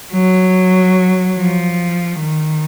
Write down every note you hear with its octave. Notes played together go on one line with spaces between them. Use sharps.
F#3
F3
D#3